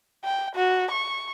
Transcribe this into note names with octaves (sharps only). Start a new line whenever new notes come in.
G5
F#4
C#6